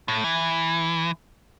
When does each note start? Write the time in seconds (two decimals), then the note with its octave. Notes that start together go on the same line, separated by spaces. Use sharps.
0.08 A2
0.24 E3